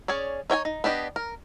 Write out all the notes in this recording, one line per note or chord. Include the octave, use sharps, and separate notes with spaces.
C#4 G#4 C#5 D5
D#4 C#5 G5 G#5
D#4
B3 D4 G4 D#5
A#4